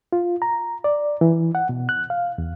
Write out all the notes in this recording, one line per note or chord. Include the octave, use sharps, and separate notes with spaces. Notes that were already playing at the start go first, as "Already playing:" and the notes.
F4
A#5
D5
E3
F#5
B2
F#6
F5
E2